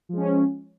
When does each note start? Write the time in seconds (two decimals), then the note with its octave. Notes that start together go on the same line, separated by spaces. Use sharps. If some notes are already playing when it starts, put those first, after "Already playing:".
0.09 F3
0.13 G#3
0.17 C#4